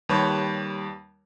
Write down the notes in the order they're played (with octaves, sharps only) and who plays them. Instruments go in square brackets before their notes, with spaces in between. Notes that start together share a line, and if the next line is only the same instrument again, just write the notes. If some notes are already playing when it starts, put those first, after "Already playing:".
[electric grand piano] D#2 G3 B4 C#5